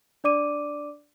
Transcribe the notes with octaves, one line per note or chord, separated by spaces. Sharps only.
D4 D5 D6 D#7